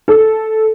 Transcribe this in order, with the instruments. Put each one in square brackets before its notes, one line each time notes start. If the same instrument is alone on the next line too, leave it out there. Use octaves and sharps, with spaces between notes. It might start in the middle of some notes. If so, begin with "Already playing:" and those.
[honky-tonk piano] A4